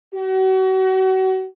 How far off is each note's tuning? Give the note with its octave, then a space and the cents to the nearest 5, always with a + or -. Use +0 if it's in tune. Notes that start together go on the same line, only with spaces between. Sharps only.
F#4 +35